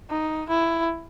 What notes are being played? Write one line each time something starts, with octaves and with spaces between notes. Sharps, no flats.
D#4
E4